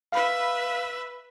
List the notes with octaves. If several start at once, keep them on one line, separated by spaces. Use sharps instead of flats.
B4 E5 F5 B5